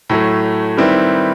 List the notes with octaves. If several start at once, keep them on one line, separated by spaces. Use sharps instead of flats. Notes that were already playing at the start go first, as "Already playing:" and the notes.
A2 F#3 A3
D#3 G3 C4 E4 B4